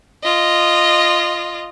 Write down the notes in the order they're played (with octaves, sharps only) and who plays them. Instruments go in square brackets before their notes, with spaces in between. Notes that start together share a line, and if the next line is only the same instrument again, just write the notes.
[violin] F4 D#5